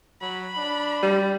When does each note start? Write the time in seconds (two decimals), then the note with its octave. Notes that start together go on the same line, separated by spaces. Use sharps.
0.21 F#3 B5
0.57 D4
1.03 G3